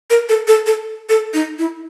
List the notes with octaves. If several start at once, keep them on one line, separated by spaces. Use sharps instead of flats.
A#4
A4
A4
A4
A4
D#4
E4